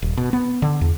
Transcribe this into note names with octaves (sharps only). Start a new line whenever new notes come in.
D#1
B2
B3
D3
E2